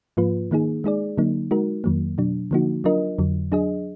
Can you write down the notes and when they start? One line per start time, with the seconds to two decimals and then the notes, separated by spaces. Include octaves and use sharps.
0.17 G#2 F3 A#3 F4 B4
0.51 D#3 A#3 D#4 G#4
0.84 G#3 D#4 G#4 D5
1.17 D3 F#3 A#3 D#4
1.51 G#3 D#4 F#4 A#4
1.84 F2 D#3 F#3 A#3
2.18 B2 F#3 D4
2.51 D3 F3 A#3 D#4 F#4
2.84 F#3 D4 F4 A#4 D#5
3.19 F2 D3 F#3
3.52 F#3 D4 G#4 D#5